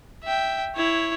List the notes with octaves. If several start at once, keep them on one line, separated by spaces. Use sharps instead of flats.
E5 G5
E4 C#5